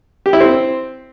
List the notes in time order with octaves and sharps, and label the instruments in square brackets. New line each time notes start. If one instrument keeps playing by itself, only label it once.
[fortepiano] G4
E4
C4